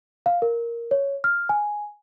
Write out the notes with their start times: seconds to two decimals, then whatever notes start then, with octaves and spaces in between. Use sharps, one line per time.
0.26 F5
0.42 A#4
0.91 C#5
1.24 F6
1.49 G#5